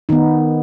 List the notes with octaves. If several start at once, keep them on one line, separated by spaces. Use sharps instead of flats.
D#3 B3 D#4